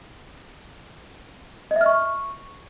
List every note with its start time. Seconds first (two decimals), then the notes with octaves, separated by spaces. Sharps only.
1.71 D#5
1.76 E5
1.81 F6
1.86 C#6